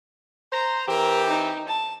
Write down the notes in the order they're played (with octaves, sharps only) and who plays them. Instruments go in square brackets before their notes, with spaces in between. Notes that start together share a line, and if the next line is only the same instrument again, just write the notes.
[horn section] C5 A#5
[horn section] E3 C4 G4 [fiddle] A#4
[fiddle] D#4
A5